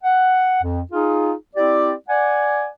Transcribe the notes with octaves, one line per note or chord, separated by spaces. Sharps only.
F#5
F2
D#4 F4 G#4
C4 E4 G4 D5
D5 F#5 G#5